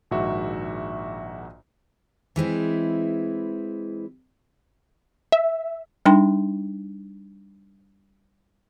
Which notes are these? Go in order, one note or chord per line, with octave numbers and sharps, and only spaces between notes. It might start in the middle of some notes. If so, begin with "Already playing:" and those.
A#1 G#2 D#3 F#4 E5 C#6
E3 G#3 C4 E4
E5
G3 D4 D#4 G5 C6